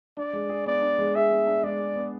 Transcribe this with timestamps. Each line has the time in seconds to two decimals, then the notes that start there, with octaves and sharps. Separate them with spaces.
0.17 D4 D5
0.33 G#3
0.49 G#4
0.66 B3 D5
0.82 D4
0.99 G#3
1.15 G#4 E5
1.31 B3
1.47 D4
1.63 G#3 D5
1.80 G#4
1.96 B3